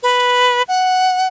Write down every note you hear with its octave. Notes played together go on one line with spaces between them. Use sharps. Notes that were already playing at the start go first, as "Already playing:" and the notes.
B4
F#5